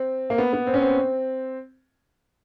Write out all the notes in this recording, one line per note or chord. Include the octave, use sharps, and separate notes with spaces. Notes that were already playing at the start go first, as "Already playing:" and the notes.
Already playing: C4
A#3
B3
B3
C4
C#4
C4